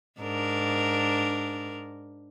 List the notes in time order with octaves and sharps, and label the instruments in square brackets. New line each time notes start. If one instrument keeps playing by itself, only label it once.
[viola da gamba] G#2 D4 A#4